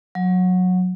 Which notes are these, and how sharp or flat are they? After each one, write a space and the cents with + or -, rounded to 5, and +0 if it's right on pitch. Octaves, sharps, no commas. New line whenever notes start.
F#3 -20